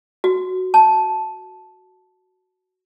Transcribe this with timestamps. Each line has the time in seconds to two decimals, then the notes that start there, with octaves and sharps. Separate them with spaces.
0.24 F#4
0.74 A5